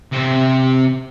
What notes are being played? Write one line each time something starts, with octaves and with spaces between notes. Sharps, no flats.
C3 C5